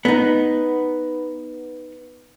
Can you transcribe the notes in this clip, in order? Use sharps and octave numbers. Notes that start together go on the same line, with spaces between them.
B3 D#4